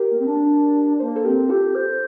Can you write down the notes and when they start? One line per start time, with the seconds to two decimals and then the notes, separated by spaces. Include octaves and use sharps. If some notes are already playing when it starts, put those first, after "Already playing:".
Already playing: G4 A#4
0.11 A#3
0.18 C4
0.25 D4
1.00 A#3 C5
1.08 A#4
1.16 A4 C5
1.24 C4 G4 A#4
1.49 F4 G4 A4
1.75 C5